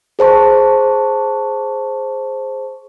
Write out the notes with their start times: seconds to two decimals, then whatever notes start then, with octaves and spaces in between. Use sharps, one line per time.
0.19 G#4 C5 A5 C#6